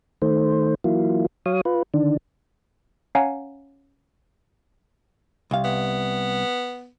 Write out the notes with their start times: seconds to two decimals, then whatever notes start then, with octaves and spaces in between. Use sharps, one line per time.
0.22 D#3 A3 C5
0.84 E3 F#3 A#3 E4 F4
1.46 F#3 C#5 F5 D#6
1.65 F4 B4
1.94 D3 D#3 D4
3.15 C#4 C#5 F5 F#5 G#5 A#5
5.51 C2 F5
5.64 B3